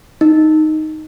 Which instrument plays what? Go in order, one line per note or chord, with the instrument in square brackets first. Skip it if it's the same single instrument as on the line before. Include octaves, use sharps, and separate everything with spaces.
[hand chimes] D#4